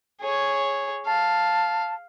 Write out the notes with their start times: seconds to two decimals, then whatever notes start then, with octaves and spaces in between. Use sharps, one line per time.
0.21 G#4 C#5
1.06 F5 A5